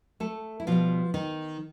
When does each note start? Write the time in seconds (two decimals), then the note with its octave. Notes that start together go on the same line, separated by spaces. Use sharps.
0.20 A3 A4
0.60 E4
0.67 B2 F3 G3 B3 F4
1.14 D#3 D#4